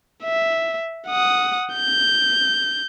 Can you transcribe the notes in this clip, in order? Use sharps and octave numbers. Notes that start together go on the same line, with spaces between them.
E5
F#5 D#6
G6